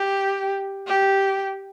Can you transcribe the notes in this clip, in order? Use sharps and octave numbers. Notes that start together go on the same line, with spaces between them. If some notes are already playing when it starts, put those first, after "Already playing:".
Already playing: G4
G4